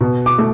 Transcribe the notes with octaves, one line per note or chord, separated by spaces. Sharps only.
B2
D6
A3